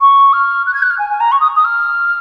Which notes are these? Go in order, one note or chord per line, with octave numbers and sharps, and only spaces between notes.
C#6
F6
F#6
G#6
F#6
F6
G#5
G#5
A#5
C#6
D#6
D#6
F6